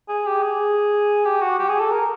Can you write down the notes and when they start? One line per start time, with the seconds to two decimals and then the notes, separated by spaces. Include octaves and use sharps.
0.08 G#4
0.26 G4
0.42 G#4
1.25 G4
1.42 F#4
1.59 G4
1.69 G#4
1.80 A4
1.91 A#4